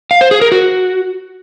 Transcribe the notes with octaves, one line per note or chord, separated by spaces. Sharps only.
F5
C5
G#4
A#4
F#4